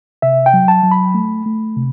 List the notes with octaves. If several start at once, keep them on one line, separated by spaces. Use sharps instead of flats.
C3 E5
G5
F#3
A5
F#3
B5
A3
A3
C3